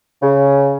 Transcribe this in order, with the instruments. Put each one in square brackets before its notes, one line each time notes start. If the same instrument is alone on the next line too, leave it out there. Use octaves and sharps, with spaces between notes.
[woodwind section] C#3